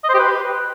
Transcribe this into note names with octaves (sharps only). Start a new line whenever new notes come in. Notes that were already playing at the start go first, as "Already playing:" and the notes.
D#5
C5
G4
B4